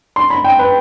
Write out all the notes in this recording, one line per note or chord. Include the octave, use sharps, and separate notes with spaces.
C6
B5
G5
B4